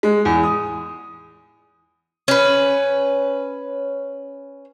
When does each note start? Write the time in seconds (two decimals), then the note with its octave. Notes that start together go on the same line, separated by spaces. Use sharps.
0.03 G#3
0.25 E2
0.43 D#6
2.28 C#4 B4